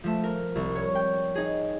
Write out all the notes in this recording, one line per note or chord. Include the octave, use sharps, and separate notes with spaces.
F3 A3
A#4
C2
C#5
G5
D#4 G#4